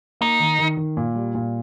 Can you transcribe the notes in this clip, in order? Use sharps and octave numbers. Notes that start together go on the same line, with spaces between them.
A#3 D#4
D#3
D#3
D#3
A#2
G3
A#2